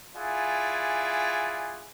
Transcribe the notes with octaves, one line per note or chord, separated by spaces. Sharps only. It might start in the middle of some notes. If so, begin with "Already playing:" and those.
E4 F4 G#4 D5 F#5 G#5